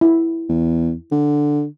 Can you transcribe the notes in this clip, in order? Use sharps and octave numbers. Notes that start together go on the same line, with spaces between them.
E4
E2
D3